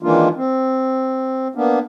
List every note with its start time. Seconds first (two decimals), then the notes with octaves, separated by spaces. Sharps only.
0.03 D#3 E3 G#3 A#3 D4 F4
0.36 C4
1.55 A#3 B3 D4